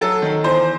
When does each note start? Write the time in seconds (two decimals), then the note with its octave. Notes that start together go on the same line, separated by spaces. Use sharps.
0.01 F#3 A4
0.22 D#3
0.44 E2 C5